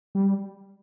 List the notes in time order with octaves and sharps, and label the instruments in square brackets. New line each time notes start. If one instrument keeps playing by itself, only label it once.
[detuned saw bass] G3